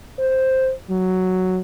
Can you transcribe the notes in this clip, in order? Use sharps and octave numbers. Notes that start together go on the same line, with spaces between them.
C5
F#3